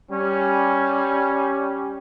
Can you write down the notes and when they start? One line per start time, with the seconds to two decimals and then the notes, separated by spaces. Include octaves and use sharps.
0.11 G3 C#4